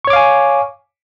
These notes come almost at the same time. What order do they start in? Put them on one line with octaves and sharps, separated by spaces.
C#6 C#5 D6 F5 G#5